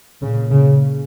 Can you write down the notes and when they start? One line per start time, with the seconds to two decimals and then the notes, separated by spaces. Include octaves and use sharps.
0.22 A#2 C#3
0.51 C#3